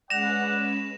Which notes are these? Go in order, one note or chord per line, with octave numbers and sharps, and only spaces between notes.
G#3 C#4 B4 D5 F#5 A#6 E7 F7